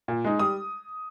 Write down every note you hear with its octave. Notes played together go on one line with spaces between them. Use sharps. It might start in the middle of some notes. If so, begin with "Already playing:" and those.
A#2
G#3 D#4
G3 D#6